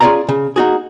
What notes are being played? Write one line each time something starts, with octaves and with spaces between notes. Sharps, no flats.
C#4 F4 G#4 D5 F5 A#5
C#3
A#3 D#4 F#4 G#4